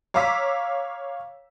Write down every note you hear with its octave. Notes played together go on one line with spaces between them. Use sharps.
C#5 F5 A#5 D6 E6 B6